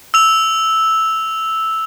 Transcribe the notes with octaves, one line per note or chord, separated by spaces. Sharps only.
E6 F7